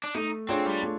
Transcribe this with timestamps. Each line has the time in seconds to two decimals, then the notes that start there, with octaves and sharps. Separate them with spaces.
0.04 D4
0.14 A3 D#4
0.49 C4 D4 F4 G#4 C#5
0.66 G3
0.83 A3